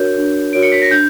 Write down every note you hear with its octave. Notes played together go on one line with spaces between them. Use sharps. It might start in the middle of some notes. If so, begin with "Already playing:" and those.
Already playing: D4 F#4 A#4 C#5 G6
D4
F#4 A#4 C#5 D7
C#7
B6
A#6
D4 G6